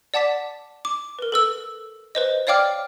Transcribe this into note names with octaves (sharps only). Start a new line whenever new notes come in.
D5 F#5 A5 D6 B6
D6
A#4 B4
A4 B4 E6
B4 C5 D#5
C#5 D5 F5 G5 D6 F6